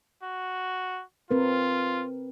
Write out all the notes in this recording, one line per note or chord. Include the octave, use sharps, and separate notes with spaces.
F#4
C4 F4 A#4 B4